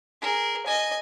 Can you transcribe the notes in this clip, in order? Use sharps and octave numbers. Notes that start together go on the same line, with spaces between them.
G#4 A#4
D#5 G#5